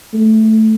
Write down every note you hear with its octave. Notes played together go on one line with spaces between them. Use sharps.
A3